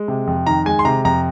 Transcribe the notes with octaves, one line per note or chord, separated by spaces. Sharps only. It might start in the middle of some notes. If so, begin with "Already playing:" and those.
Already playing: G#3
C3
F2
D#3 A#5
G#3 G#5
C6
C3 A#5
F2 A#5